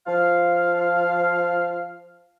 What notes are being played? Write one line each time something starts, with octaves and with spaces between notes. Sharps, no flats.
F3 F5